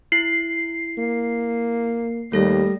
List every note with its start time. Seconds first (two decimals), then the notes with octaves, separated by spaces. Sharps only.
0.12 E4 C7
0.98 A#3
2.32 D#2 G3 A3 A4 A#6